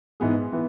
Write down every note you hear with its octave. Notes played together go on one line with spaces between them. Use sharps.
G#2 E3 B3 G#4
E3 B3